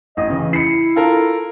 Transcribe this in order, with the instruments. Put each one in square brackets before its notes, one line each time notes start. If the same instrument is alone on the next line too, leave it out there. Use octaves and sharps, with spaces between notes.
[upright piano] A1 [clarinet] D#5
[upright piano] C#3 [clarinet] E3
[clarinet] E4 [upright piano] C7 C#7
[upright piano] F4 A4 A#4